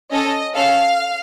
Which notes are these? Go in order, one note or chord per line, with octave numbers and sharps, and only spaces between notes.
C#4 A4 D#5
C#4 A4 F5